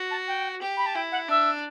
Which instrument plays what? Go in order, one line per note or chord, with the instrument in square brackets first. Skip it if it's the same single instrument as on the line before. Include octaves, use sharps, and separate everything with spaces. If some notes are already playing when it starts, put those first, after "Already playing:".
Already playing: [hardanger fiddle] F#4
[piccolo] A5
G5
[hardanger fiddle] G4
[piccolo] B5
A5
[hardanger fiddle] E4 [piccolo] G5
[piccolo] F#5
[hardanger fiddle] D4 [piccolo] E5